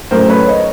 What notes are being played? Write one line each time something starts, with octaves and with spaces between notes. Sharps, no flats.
A2 F#3 A3 C#4 A#4 C5
B4 C#5
C#5 D#5